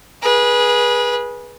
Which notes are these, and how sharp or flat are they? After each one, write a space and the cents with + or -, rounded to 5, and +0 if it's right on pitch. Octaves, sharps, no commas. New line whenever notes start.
G#4 +0 B4 -25